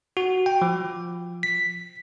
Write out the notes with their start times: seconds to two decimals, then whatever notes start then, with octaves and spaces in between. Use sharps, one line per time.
0.17 F#4
0.46 G5
0.62 F3
1.43 B6